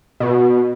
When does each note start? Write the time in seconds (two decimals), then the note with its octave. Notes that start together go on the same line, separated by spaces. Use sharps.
0.20 B2